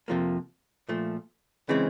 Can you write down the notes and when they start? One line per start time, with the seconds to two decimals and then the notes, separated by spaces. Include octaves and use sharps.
0.08 F2 C3 F3 A#3
0.89 A#2 F3 A3
1.69 C#3 E3 G#3 C4